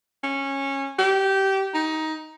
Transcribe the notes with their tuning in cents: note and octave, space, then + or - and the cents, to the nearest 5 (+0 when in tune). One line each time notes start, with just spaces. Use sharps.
C#4 -15
G4 -20
D#4 +15